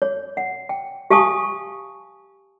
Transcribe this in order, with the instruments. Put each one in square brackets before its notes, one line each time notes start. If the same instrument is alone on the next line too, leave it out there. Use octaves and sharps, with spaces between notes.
[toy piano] C#5
F#5
G5
G4 F5 G#5 A5 C#6 D#6